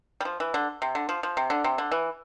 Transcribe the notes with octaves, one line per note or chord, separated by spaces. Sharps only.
G3
F3
E3
D3
C3
D3
F3
F3
C3
D3
C3
D3
E3